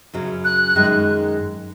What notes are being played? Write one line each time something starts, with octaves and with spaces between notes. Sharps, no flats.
F#2 C#3 F#3 C#4
F#6
F#2 D#3 G#3